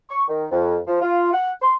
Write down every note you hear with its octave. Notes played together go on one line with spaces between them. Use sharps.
C#6
D#3
F2
F3
F4
F#5
C6